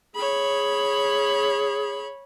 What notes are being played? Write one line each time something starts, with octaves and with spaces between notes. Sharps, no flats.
G#4 C#5 B5